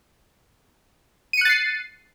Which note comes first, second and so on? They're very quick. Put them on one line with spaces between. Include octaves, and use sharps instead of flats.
D#7 C#7 F#6 A6 C7